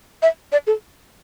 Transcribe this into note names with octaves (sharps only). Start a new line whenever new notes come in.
E5
D5
A4